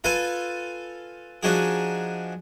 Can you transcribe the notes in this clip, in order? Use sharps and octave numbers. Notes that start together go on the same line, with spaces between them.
F4 A4 B4 F5 G#5
F3 D4 D#4 F#4 G#4